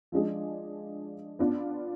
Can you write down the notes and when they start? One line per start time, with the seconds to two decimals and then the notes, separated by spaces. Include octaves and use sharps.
0.12 F3 G#3 D4 G#4
1.39 B3 D4 F4